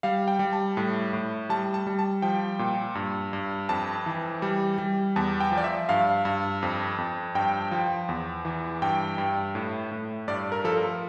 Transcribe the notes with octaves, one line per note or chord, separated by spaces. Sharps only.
G3 F5
G5
G3
A5
A2
A2
G3 A5
A5
G3
A5
F3 G5
A#2
G2
G2
F2 A5
E3
G3
G3
E2 A5
G5
F3
D5
E5
G2 F5
G2
F2
F2
G2 G5
F3
E2
E3
G2 G5
G2
A2
A2
G2 D5
A#4
F3 A4
A#4